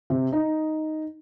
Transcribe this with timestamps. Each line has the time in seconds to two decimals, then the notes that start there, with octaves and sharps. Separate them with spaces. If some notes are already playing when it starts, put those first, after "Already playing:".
0.10 C3
0.32 D#4